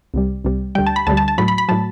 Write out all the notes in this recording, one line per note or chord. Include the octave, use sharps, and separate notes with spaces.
C2 C3 G3
C2 C3 G3
D2 D3 G3 G5
A5
B5
D2 D3 G3 A5
A5
A5
A2 F#3 B5
B5
B5
A2 F#3 A5